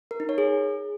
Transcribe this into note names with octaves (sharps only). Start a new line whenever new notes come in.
A#4
D#4
C#5
G#4